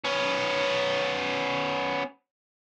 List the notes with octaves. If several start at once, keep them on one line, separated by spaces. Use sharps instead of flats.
B3 C#4